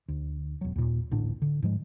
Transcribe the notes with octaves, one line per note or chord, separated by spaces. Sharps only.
D2
E1 F#3
D#2 A#2
A1 D2 A2 D4
D3
G#2 F3 G#3